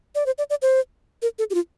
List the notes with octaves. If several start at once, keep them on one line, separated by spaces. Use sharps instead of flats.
D5
C5
D5
D5
C5
A#4
A4
G4
F4